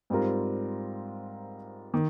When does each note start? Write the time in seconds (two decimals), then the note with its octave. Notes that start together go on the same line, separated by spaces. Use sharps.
0.10 G#2 G3 C4 F4 A#4
1.94 D#3